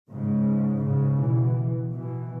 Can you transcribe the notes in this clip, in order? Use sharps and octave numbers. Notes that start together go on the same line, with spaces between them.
G#2 C#3
G#2 C#3
B2 E3
B2 E3